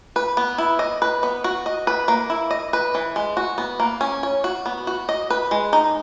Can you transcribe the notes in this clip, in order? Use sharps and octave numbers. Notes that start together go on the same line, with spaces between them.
B4
B3
E4
D#5
B4
B3
F#4
D#5
B4
A#3
E4
D#5
B4
E3
G#3
F#4
B3
A#3
C#4
C#5
F#4
B3
F#4
D#5
B4
G#3
D#4